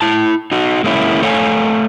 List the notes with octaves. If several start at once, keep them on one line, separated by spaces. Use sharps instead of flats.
E4 A5
D#4 F#4
G#3 A#3 C#4 E4
A3 A4 C#5 F5 G#5